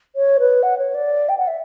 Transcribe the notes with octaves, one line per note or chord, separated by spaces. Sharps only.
C#5
B4
F#5
C#5
D5
G5
F#5
E5